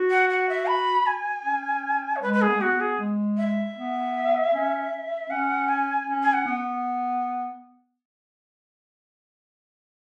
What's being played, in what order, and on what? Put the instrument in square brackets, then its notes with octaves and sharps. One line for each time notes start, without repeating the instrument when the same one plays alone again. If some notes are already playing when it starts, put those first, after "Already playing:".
Already playing: [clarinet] F#4
[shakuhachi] F#5
F#5
E5
B5
G#5
[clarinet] C#4
[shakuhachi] C#5
[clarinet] G#3 [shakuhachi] B4
[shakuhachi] B4
G#4
[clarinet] B3
G#3
[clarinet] B3 [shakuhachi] F#4
[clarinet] B3
[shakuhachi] G#4
[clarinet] G#3
[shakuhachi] E5
[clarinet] B3
C#4
[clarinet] C#4 [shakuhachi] F#5
[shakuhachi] G#5
[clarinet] C#4
[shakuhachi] G#5
F#5
[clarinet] B3